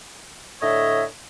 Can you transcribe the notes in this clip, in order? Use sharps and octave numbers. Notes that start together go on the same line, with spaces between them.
A2 D3 C#5 D#5 E5